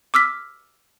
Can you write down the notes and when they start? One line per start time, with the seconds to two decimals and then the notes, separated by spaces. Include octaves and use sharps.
0.14 D6 E6 F6 B6